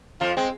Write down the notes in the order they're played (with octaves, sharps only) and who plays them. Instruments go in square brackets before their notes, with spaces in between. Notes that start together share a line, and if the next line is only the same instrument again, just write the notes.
[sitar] F2 F3 [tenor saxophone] F4
[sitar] G#3 [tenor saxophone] C4